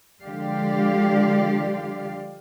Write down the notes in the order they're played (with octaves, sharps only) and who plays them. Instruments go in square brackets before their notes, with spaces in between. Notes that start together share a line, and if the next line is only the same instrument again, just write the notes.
[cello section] D3 F3 G#3 G4 D5 F5